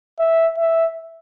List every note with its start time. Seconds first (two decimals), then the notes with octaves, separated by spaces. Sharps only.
0.19 E5
0.58 E5